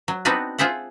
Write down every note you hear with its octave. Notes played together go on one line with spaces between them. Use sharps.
F#3
B3 C4 D4 D#4 F#4 B4
F4 G#4 C5 E5 F#5